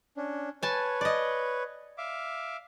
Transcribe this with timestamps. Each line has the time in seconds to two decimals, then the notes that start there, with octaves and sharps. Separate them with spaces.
0.17 C#4 D4
0.63 B4 C#5 G#5 A5
1.01 D5 D#5
1.98 E5 F5 D6